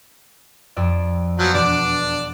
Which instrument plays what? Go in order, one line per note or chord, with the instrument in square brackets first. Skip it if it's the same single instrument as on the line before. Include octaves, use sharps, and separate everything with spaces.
[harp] F2 D5 E6
[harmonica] F3 F#3 [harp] B3 F#6
[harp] E1 [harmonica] D4 D5